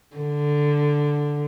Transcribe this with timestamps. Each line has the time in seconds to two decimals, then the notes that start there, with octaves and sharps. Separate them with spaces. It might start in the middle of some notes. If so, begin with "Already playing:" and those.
0.16 D3